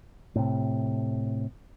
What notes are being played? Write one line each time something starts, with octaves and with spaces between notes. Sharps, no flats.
A2 C3